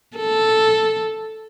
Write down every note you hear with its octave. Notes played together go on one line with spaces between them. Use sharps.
A4